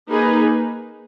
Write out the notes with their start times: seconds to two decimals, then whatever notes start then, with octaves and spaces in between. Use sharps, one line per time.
0.09 A#3 D#4 G#4 B4